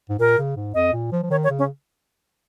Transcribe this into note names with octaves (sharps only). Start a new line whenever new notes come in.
G#2
A#2 A#4
C#3
G#2
F2 D#5
A#2
F3
F3
D#3 C#5
C#5
C#3
C#4